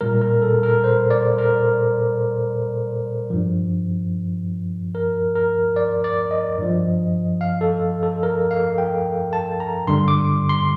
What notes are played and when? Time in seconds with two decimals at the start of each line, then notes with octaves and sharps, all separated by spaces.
0.01 A#2 G3 A#4
0.21 A#4
0.42 A4
0.63 A#4
0.84 C5
1.10 D5
1.38 A#4
3.30 G2 F3
4.95 A#4
5.36 A#4
5.76 D5
6.04 D5
6.31 D#5
6.58 G2 F3
7.41 F5
7.61 A4
8.03 A4
8.23 A#4
8.51 F5
8.78 G5
9.33 A5
9.60 A#5
9.87 G2 D3 G3 C6
10.08 D6
10.49 C6